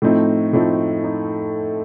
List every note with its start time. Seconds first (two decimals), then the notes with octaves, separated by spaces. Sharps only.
0.02 A2 F3 A3 C4 D#4
0.53 A2 F3 A3 C4 D#4
1.04 D#4